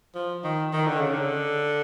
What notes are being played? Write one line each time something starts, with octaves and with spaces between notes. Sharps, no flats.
F3
D#3
D#3
D3
C#3
D3